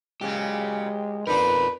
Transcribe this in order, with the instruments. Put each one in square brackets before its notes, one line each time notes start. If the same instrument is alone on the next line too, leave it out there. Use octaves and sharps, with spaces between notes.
[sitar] A#2 C#3 F#3 [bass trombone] G#3 [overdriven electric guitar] G4
[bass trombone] F2 [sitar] D4 D#4 [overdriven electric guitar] A#4 D5 [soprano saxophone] B4